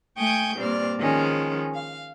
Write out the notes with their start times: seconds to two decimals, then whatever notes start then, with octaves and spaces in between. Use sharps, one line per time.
0.18 A3 G5 G#5 C#6 D#6 G6
0.58 G2 A#2 C4 D5 F6
1.00 D#3 F3 G#3 C#4
1.75 F5